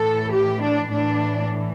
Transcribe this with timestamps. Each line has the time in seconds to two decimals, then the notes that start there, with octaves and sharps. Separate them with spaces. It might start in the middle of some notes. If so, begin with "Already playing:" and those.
Already playing: A2 E3 A4
0.33 G4
0.62 D4
0.91 A2 E3 D4